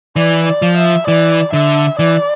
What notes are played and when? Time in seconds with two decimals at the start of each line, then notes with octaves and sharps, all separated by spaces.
0.16 E3 D5
0.47 D5
0.62 F3
0.77 E5
1.07 E3 D5
1.53 D3 E5
1.99 E3 D5